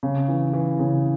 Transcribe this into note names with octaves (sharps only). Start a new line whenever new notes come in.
C#3
E3
E3
C#3